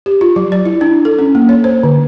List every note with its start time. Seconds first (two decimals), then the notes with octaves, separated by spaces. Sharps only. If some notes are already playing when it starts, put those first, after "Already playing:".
0.06 G4
0.21 F4
0.36 F#3
0.52 D5
0.65 E4
0.81 D4
1.05 A4
1.19 C#4
1.35 A#3
1.49 C#5
1.64 C5
1.83 D3